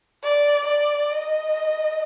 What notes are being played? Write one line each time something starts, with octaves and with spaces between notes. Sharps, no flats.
D5
D5
D#5